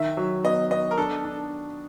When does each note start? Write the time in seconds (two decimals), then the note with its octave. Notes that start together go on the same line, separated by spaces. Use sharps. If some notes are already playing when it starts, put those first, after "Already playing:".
Already playing: D#3 E5
0.17 F#3
0.44 B3 D#5
0.71 B3 D#5
0.91 A#4
0.98 D4 A4
1.25 D4